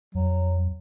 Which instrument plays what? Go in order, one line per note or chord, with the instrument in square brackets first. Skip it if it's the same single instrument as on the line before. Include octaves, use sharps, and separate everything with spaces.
[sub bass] F2 [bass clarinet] F#3